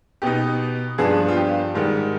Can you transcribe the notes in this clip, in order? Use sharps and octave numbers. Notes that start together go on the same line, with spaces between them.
B2 B3 D#4 G4
G2 F3 B3 D4 G#4
F4
G4
G#2 D#3 G3